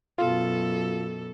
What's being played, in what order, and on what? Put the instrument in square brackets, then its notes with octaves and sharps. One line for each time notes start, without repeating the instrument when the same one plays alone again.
[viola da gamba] F#2 B2 A4 [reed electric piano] F4